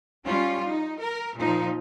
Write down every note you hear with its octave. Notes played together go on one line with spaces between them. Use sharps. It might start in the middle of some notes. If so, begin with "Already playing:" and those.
G3 C#4 F4
D#4
A#4
A#2 F3 D#4